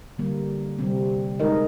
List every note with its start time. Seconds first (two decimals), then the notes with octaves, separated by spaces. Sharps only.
0.18 D3 G3 A#3
0.79 C3 G3 C4
1.39 D#3 G#3 D#4 A#4 D#5